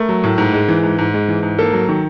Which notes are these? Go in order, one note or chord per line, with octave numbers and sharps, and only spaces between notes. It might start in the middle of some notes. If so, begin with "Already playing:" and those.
Already playing: A3 A#4
F#3
A2
G#2
G#3
E3
G#2
G#2
G#3
E3
G#2
A#3 A4
F#3
D#3